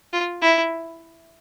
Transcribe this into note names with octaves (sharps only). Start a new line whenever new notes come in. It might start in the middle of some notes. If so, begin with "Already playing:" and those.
F4
E4